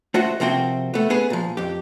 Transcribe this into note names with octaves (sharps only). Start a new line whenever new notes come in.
A3 F4 F#4 C5 D#5 F#5
C3 F3 A#3 C4 F#4 G5
A3 B3
B3 G#4 B4
A#2 F3
F2 G4